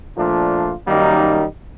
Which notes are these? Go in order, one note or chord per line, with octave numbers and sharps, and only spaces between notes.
A#2 F3 A3 D4 F4
F#2 D#3 G3 A#3 D#4